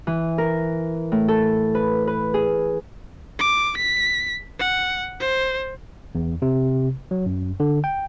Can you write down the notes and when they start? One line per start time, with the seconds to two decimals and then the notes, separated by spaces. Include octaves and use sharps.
0.07 E3
0.38 A#4
1.12 A2
1.28 A4
1.75 B4
2.07 B4
2.34 G#4
3.39 D6
3.77 B6
4.59 F#5
5.20 C5
6.15 E2
6.42 C3
7.11 F#3
7.26 F#2
7.60 D3
7.84 G5